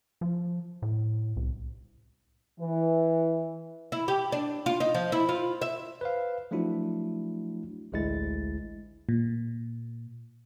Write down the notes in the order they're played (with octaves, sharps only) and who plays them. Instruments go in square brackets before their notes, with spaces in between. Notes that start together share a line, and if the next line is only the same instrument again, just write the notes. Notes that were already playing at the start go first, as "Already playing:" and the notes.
[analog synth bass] F3
A2
C2
[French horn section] E3
[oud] E4
G4
D4
F4
D#4
F3
E4
F4
E5
[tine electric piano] B4 C5 F5
F3 F#3 A3 D4 E4 F#4
A1 D2 G#3 E4 A6
[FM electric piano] A#2